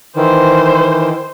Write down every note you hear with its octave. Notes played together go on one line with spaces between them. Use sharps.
D#3 E3 C5